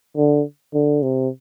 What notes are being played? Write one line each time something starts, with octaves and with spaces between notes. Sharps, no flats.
D3
D3
C3